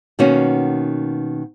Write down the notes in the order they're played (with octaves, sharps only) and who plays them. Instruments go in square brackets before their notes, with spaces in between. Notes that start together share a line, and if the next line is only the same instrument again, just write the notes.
[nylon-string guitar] B2 D#3 A#3 B3 C#4 F#4